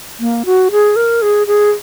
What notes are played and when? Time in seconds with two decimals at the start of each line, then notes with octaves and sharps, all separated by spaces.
0.20 A#3
0.46 F#4
0.72 G#4
0.96 A#4
1.22 G#4
1.47 G#4